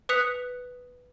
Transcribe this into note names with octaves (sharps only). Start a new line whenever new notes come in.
B4 D#6 F#6 B6 C#7 F7